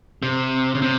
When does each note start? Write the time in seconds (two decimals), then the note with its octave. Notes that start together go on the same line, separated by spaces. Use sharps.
0.23 C3
0.75 C#3
0.82 C3